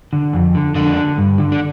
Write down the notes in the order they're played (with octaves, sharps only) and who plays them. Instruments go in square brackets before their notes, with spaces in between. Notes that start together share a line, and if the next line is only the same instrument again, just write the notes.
[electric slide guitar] D3
F2
D3
F2 D3 D4
D3
G2
D3
D4